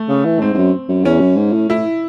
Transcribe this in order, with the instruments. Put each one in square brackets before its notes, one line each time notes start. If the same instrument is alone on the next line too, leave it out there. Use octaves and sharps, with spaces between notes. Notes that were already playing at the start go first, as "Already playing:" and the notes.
Already playing: [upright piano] A3
[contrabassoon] C#3
E3
[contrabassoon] G#2 [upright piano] C4
[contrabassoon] G#2
F#2
F#2
[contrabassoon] E2 [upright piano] C#4
[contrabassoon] F#2
G#2
A2
[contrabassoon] A2 [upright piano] E4